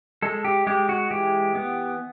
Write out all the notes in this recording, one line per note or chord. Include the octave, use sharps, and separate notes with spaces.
G#3 A4
G4
G#3 G4
F#4
E3 G4
B3